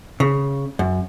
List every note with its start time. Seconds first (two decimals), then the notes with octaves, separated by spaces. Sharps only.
0.20 C#3
0.79 F#2